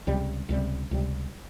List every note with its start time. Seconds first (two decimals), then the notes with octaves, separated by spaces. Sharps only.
0.07 C#2 C3 G3
0.49 C#2 C3 G3
0.91 C#2 C3 G3